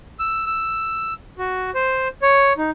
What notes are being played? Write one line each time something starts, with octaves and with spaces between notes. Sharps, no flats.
E6
E6
F#4
C5
C#5
D#4